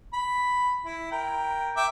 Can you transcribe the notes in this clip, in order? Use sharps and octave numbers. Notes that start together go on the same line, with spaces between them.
B5
E4
A#4 G5
E5 G5 D6